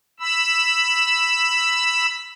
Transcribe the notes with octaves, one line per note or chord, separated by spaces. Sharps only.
B5 E6